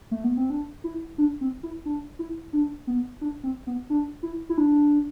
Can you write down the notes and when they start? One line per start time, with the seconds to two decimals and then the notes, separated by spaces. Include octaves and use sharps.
0.11 A3
0.24 B3
0.37 C4
0.50 D4
0.84 E4
1.18 D4
1.41 C4
1.63 E4
1.86 D4
2.19 E4
2.53 D4
2.87 B3
3.21 D4
3.44 C4
3.67 B3
3.90 D4
4.23 E4
4.49 E4
4.58 D4